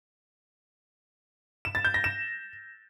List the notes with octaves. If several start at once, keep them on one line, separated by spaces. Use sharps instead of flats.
E7
A6
G6
A#6
E7